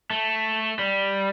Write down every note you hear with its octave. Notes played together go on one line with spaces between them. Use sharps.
A3
G3